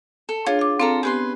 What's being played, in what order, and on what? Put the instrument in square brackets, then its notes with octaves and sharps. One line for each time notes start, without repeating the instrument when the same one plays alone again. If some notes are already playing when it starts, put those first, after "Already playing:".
[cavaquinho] A4
[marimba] D4 G#4 C#5 [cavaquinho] F4
[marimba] F5 D6
[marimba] C4 [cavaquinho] F4 A4 A#5
[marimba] B3 G4 [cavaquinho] G#4 B4 C6